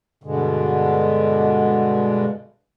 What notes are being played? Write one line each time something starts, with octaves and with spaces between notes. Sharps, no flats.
G2 B2 D3 G#3